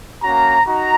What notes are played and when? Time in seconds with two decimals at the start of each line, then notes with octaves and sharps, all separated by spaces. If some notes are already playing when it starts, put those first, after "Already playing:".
0.23 A#3 C#4 F#4 A#5
0.66 D#4 F#4 A#5